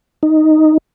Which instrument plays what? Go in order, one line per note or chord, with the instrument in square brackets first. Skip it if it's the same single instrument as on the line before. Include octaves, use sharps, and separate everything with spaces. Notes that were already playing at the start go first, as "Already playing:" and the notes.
[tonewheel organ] D#4